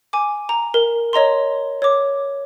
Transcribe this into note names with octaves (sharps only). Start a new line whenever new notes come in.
G#5 D6
A#5
A#4
C#5 D#5 A#5 C6
C#5 D6